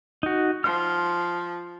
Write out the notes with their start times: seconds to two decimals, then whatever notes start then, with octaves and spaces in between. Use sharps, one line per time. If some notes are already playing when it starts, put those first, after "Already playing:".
0.23 D#4 F#4
0.64 F3 C6 F6